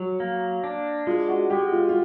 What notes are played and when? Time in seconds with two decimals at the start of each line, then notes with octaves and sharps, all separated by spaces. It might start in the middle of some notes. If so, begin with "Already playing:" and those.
Already playing: F#3
0.20 A#3
0.64 D4
1.07 G#3 F4
1.29 F#4
1.50 G#3 G4
1.72 F4
1.89 F4